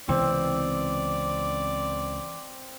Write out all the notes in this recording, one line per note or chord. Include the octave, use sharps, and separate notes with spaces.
C#2 C3 E3 B3 C4 D5